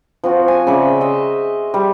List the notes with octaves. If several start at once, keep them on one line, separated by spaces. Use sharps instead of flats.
F3 C4 F#4
G#5
C#3 D5 E5 D6
C5 D#5 E5
G3